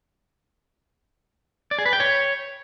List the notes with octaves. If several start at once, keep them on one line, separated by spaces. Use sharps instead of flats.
D5
G#4
B4
G5
C#5